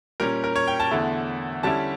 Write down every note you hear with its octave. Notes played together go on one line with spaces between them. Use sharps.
A#2 G3 C#4 A#4
A#4
C#5
G5
A5
E2 D3 A3 E4 A5
D3 G3 C#4 E4 A5